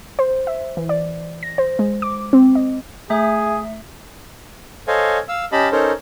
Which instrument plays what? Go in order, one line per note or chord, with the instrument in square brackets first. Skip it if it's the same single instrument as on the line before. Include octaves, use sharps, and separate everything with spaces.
[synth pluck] C5
E5
E3
D5
A#6
C5
G#3
D6
C4
D#5
[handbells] A3 E5 [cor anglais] G#4
[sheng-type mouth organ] A4 C5 C#5 D#5 F5 G#5
F5 E6
C#4 G4 D#5 A5 B5
C#4 D#4 A4 A#4 C5 C#5